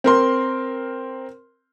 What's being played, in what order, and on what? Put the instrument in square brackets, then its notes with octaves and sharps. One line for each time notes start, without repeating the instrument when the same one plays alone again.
[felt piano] C4 A#4 C6